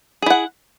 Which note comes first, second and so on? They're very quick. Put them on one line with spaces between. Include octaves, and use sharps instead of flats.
G#4 E4 F#5